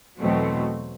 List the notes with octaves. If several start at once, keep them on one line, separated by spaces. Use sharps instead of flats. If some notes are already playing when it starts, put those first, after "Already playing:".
E2 B2 F#3 A3 C4